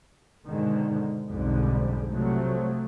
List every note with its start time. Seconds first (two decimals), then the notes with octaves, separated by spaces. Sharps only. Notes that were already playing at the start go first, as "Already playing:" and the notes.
0.45 G#2 B2 D3 D#3
1.28 B1 F2 G#2 D3 G3
2.10 C3 F3 F#3 A3